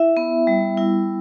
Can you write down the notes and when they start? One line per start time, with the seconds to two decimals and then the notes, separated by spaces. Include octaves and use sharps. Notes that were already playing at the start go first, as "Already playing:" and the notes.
Already playing: E4 E5
0.17 B3
0.47 G3
0.77 E4